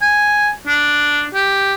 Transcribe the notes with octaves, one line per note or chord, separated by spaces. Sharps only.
G#5
D4
G4